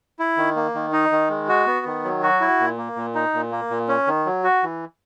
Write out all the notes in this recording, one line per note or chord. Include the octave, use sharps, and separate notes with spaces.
E4
D#3
A#3
D#3
D#4
D#3
G#3
F#4
B3
D#3
F#3
F#4
E4
A#2
A#3
A#2
D#4
A#2
A#3
A#2
C#4
D#3
F#3
F#4
E3